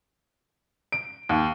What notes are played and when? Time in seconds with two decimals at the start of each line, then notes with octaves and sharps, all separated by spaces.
0.92 D7
1.29 D#2